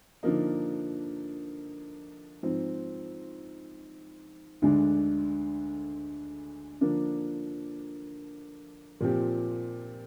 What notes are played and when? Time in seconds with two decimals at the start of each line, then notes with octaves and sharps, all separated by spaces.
0.23 D3 F3 A#3 D#4
2.43 G#2 F3 C4
4.62 D2 D3 G#3 D4
6.81 D3 F3 A#3 D4
9.01 A#2 F3 C4 G4